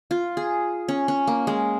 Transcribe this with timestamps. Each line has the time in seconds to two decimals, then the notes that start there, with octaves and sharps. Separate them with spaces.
0.11 F4
0.37 G#4
0.88 C#4
1.08 C#4
1.27 A#3
1.47 G#3